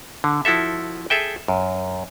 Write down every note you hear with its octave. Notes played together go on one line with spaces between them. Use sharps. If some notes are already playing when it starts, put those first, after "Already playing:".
D3
F3 E4 F#4 A4 E5
G#4 A4 E5 G5
F#2